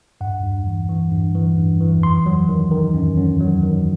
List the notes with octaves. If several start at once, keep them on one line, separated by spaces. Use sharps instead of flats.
G2 F#5
G2
E3
E3
G2
E3
G2
E3
F#2 C6
F#3
D#3
D#3
F#2
F#2
F#3
D#3